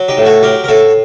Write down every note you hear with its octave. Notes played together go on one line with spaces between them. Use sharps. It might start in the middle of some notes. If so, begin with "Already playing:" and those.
Already playing: F#3
D#4 G4
A2
F#4 A4
F#3 G4 A#4
A#4
A2 F#4 A4